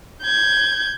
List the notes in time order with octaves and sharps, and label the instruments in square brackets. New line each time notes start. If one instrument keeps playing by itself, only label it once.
[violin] G6 G#6